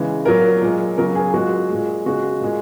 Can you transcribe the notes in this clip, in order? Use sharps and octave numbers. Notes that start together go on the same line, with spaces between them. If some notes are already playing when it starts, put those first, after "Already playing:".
Already playing: C#3 E3 G#3
A#2 F#3 A#4
A#2 G#3
C#3 F#3 A#4
G#4
A#2 G#3 F#4
A#2 G#3
C#3 G#3 F#4
A#2 G#3